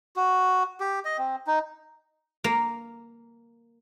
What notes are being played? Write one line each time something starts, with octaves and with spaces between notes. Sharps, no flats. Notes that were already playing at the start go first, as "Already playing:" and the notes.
F#4
G4
D#5
C4
D#4
A#3